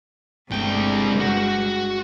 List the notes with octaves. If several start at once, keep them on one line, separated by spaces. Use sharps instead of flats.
G1 C2 G2 G#3 A3 G5
F#4